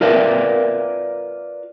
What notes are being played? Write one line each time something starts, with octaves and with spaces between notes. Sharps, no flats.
F4 A#4 B4 D5 E5 F5